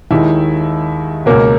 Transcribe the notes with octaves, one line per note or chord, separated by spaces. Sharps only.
D#2 D#3 G#3 E4
C#2 B2 F#3 A#3 A#4